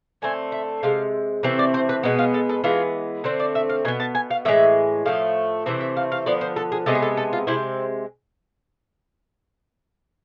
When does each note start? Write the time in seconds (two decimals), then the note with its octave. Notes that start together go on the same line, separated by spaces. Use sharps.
0.22 D3 A3 C4 G#5
0.52 E5
0.83 C3 G#3 F5
1.43 C3 E3 A3 C4 E5
1.59 D5
1.74 C5
1.89 B4
2.03 B2 G#3 B3
2.19 F4
2.34 A4
2.49 A4
2.64 E3 G#3 B3 F4
3.24 D3 A3 C4 C5
3.40 D5
3.55 E5
3.69 F5
3.85 B2 G#5
3.88 B3
4.00 A5
4.15 G#5
4.30 F5
4.45 A2 E3 G#3 E5
5.05 A2 F3 A3 F5
5.66 C3 E3 A3 C4 E5
5.80 E5
5.96 F5
6.12 F5
6.26 D3 F3 B3 D5
6.41 C5
6.56 A4
6.72 G#4
6.86 C3 G#3 B3 A4
6.95 G#4
7.02 A4
7.17 A4
7.33 F4
7.47 C3 G#3 C4 E4